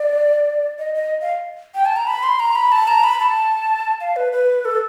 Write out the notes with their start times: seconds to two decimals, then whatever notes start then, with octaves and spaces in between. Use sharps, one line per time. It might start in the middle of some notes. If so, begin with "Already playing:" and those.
Already playing: D5
0.79 D#5
0.95 D#5
1.22 F5
1.75 G5
1.86 A5
1.96 A#5
2.07 B5
2.23 C6
2.40 A#5
2.55 B5
2.72 A5
2.88 A#5
3.04 B5
3.20 A5
4.01 F5
4.16 B4
4.33 B4
4.65 A4